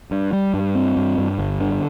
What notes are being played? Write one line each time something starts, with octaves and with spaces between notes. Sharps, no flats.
G2
G3
G2
C4
G2
G2
G1
D3